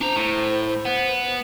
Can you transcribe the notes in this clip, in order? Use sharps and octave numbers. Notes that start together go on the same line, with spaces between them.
D4 C5 A#5
A2
B3